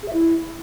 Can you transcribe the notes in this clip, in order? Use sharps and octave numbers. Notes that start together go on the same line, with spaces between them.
G#4
E5
E4